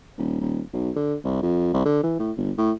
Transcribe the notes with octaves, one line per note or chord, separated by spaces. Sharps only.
D#1
D#1
B1
D3
C2
F2
C2
D3
E3
A2
G1
A2